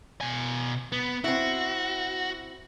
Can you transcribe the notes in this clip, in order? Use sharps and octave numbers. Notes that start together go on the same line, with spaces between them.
B2 G#5
B3
C4 E4 F#4